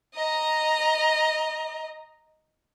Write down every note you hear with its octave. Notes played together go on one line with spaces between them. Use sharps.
D#5 A#5